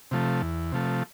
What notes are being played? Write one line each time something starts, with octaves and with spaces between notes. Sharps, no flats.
C3 F3 A3
E2
C3 F3 A3